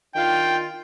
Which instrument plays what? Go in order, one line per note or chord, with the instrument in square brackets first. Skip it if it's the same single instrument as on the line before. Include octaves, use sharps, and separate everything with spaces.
[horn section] D#3 D4 F4 [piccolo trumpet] G5